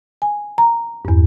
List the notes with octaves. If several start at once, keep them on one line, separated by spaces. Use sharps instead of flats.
G#5
A#5
E2 G2